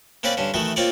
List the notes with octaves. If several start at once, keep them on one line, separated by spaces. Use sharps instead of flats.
A#3 C4 C#4 B4 D5
G2 D3 C#4
D#3 E3 A3 F#4
A#3 C4 F4 C#5 D5